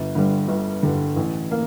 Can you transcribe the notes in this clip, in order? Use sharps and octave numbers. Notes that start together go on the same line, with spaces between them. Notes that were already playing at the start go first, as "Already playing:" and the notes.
Already playing: G1
G2 D3 G3
G1
G2 D3 G3
A1
A#3